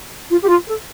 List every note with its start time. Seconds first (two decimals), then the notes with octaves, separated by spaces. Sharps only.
0.30 F4
0.41 G4
0.48 F4
0.66 A4